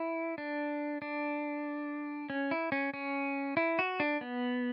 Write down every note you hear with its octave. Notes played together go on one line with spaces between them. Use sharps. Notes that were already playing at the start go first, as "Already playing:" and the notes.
Already playing: E4
D4
D4
C#4
E4
C#4
C#4
E4
F#4
D4
B3